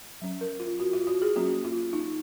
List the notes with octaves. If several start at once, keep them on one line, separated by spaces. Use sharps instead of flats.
F#3 C#4
A#4
F4
F#4
F4
F#4
G#4
F#3 A#3 C#4 F#4
F4
D#4